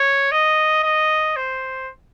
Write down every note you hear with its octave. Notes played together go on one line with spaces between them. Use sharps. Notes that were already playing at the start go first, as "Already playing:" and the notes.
Already playing: C#5
D#5
D#5
C5